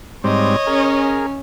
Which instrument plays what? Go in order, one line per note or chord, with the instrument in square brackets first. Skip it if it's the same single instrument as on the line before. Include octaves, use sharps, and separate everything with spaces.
[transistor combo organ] G#2 G3 C4 [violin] C#5 D#5
[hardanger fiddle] C#4 [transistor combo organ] G#4 A#4